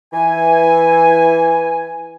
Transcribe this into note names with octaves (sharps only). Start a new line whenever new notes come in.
E3 G#5